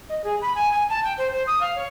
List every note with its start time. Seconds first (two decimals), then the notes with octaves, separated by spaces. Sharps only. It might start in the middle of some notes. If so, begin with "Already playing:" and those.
0.09 D#5
0.23 G#4
0.41 B5
0.55 G#5
0.71 G#5
0.89 A5
1.03 G5
1.17 C5
1.31 C5
1.47 D#6
1.60 F5
1.75 C#5